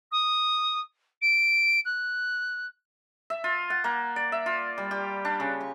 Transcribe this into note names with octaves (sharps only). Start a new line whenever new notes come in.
D#6
D7
F#6
E5
F4
F#5
A#3
D5
E5
F4
G3
G4
D4
C#3
C#6